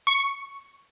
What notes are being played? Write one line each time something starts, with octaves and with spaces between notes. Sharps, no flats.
C#6